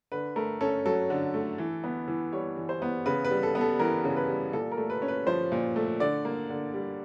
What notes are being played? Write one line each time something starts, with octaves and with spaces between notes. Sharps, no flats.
D3 B4
A3 A#4
C#4 A4
F#3 A4
D3
A3
E3
B3
E3
G3 C#5
E3
C5
B3
C#3 B4
B4
G3
A4
B3
A4
E3 A#4
C#3
B4
G3
A#2 A4
A#4
A3
B4
C#4
B4
F3 C5
A#2
A3
D3 D5
A#3
D3
G3